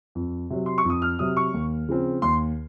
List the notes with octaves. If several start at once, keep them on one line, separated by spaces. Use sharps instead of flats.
F2
C3 F#3
C6
C#6
F2 D#6
F6
C3 F#3 D#6
C#6
D#2
C#3 F3 C4
D#2 C6